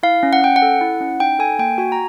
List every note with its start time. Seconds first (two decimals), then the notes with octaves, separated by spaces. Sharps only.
0.03 E4 F5
0.23 C#4
0.33 F#5
0.42 C#4 G5
0.56 F#5
0.62 A4
0.81 E4
1.01 C#4
1.20 D#4 G5
1.39 A4 G#5
1.59 A#3 G5
1.78 F#4 G#5
1.92 A#5